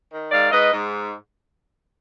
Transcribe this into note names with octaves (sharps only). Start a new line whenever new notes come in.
D#3
G#2 D5 F5
G#2 B4 D#5
G#2